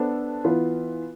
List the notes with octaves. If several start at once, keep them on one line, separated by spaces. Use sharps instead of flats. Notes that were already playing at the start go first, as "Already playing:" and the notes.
Already playing: B3 D4 A4 C5
E3 B3 F4